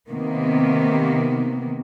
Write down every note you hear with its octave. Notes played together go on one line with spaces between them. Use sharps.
C3 D#3 A#3 B3